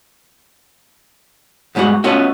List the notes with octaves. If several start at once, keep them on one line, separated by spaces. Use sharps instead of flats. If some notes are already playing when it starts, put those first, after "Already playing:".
E2 G#2 G3 G#3 F#4
A3 B3 C#4 F4 F#4 D#5